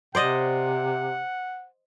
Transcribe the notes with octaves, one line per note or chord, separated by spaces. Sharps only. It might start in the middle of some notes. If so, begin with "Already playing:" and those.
C3 C5 D5 D#5 F#5